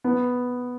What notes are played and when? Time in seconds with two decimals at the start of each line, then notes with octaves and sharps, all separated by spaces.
0.04 B3